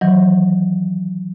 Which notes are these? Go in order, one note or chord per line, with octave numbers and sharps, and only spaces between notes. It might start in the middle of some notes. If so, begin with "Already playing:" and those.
D#3 E3 F#3